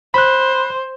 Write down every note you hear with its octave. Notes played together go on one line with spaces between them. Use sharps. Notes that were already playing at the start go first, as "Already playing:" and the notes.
C5 B5 F#6